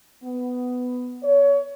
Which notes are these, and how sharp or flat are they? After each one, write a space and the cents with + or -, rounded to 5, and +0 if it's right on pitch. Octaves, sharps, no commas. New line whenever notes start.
B3 +10
C#5 +30